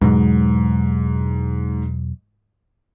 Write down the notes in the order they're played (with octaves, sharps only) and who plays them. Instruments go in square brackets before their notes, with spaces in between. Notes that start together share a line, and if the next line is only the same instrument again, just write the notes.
[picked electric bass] E2 B2 F#3 [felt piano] G#2